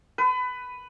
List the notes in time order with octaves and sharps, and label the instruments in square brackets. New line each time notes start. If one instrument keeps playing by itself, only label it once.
[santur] B4